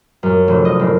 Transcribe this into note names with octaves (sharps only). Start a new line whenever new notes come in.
F#2
F1
D#5
F#1